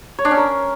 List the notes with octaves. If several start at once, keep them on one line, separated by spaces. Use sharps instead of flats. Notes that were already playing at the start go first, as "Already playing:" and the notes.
C#5
D4
C#4
A#4